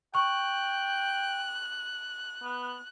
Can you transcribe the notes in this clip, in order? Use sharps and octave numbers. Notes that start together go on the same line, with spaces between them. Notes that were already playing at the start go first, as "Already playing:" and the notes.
G5 C#6 F#6
B3